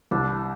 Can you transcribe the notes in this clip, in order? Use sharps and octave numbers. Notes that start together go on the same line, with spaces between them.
C2 D4